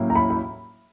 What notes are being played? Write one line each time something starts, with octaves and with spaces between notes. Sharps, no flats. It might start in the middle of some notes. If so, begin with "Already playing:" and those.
Already playing: A2 F#3 A#3 C#4 E4
A#5
B5
B5